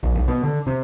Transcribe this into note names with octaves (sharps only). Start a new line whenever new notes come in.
A#1
B1
B2
D3
C3